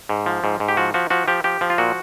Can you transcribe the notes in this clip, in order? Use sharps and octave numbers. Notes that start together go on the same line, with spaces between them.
G#2
F3
G#2
G#2
G4
F3 F#4
F3 F#4
F3 F#4
F3 G4
F3 G4
F3
F4
A#2 F#4